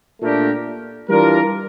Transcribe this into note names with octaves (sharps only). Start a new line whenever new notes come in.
A#2 A3 D4 G4 A#4
E3 G3 D4 F4 A#4